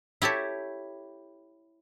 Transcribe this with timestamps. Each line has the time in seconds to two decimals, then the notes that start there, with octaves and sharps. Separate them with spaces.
0.22 E4 G4 A4 C#5